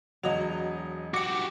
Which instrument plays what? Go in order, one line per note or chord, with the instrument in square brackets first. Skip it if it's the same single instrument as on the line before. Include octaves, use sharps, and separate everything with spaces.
[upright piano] E1 D#5 F7 [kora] F#3
[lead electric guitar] F#4 G4 [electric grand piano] D6 C#7